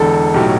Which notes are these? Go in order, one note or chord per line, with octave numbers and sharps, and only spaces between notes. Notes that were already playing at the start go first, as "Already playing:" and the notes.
Already playing: E1 E2 D3 A4
B1 A2 F#3 G4